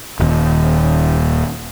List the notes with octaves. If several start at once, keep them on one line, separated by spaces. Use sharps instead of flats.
D#1 D#2